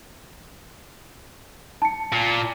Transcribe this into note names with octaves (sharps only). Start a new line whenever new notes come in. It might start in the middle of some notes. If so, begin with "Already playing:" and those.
A5 C#7
A#2